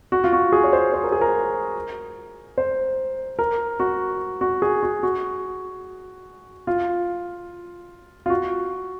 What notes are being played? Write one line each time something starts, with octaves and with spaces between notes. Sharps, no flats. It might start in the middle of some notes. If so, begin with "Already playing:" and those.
F#4
F4
F#4
G#4
C#5
C5
C5
A#4
G#4
A#4
C5
A#4
F#4
F#4
G#4
F#4
F#4
F4
F4
F#4